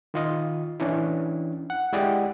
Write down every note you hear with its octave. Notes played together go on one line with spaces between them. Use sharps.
D#3 F4 D#5
E3 C#4 D4 E4
F#5
G#3 E4 G4 D5 D#5 F#5